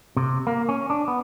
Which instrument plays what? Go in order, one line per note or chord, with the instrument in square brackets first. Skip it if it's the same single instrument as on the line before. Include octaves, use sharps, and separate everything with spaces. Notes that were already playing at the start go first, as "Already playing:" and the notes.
[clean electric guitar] C3
A#3
C#4
D4
B3